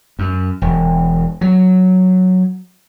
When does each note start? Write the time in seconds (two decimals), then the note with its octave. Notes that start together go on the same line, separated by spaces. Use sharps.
0.19 F#2
0.62 E1
1.41 F#3